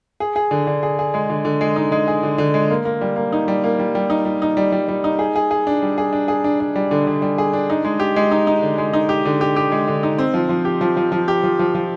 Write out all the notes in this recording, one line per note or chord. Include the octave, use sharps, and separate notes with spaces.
G#4
G#4
D3
D3
G#4
G#4
G#3
D3
D3
G#3
D#4
G#3
G#4
D3
D3
G#3
A#3
A#3
G3
A#3
D#4
G3
A#3
G3
G3
D#4
G3
D#4
G3
G3
G3
D#4
G#4
G#4
G#4
D4
G3
G#4
D4
G#4
D4
D4
G3
D3
D3
G3
G#4
D4
D#4
G#3
G4
G#3
D#4
D#4
D3
G#3
D#4
G4
D3
G4
G4
G#3
D3
D#4
C4
F3
F3
G4
F3
F3
F3
G4
F3
F3
F3